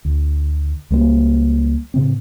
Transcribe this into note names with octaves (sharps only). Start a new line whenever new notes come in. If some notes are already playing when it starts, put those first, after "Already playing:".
D2
C#2 G3 A#3
A2 C#3 C4